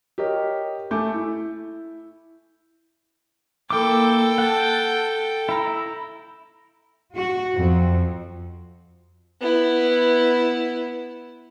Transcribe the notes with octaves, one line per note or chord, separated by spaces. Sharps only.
G4 A#4 C#5 D#5
A3 G#5 D6 G6
E4
A#3 E4 A4 G5 D6
F#5 A5
E4 A#5
F#4
F2
B3 E4